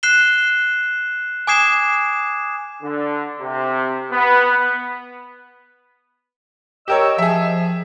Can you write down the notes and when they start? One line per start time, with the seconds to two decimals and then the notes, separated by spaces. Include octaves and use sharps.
0.03 F#6 C7 E7 G7
1.47 G#5 D6 D#6 G#6 C7 E7
2.83 D3
3.40 C3
4.12 B3
6.88 G4 A#4 C#5 D#5 G5 E6
7.18 F3 G#4 E5